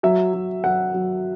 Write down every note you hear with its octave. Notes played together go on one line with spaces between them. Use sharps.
F#3 E5
F#3
F#3 F#5
F#3